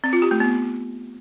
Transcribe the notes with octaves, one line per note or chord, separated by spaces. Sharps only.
C4
F4
G4
A3
B3